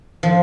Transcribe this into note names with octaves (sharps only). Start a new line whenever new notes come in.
F3